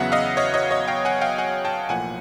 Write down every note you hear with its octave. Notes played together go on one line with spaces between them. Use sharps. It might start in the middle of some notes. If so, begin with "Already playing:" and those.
Already playing: E2 C#3 F#3 B3 E5 F#5
D#5 F5
C#5 D#5
C#5 D#5
C#5 D#5
F5 G5
F#5 G#5
F5 G5
F#5 G#5
G5 A5
B1 A2 F3 A#3 F#5 G#5